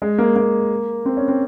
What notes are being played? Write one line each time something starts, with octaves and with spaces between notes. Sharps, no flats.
G#3
A#3
A#3
C4
C#4
C4